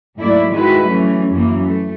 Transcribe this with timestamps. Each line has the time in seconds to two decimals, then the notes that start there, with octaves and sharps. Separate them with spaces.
0.17 G#2 F#3 A3 A#3 E4 D5
0.52 D#3 G#3 E4 F#4 B4
0.87 E3 F#3 A3 C#4
1.30 F#2 E3 A#3
1.66 A3